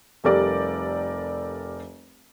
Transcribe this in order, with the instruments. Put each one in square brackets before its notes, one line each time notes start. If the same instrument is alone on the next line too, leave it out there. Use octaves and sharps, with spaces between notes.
[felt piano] F1 G3 G4 A4 A#4 D5